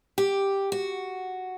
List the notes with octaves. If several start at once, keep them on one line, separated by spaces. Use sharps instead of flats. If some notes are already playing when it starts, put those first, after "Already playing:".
G4
F#4